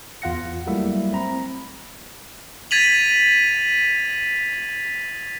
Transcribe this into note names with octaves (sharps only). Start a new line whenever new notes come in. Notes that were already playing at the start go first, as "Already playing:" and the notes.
E2 F4 F5 F#5 A#6 C#7
F#3 G3 A3 A#3 E4 E5
C4 A#5 B5
G#6 A6 B6 D#7 F7 F#7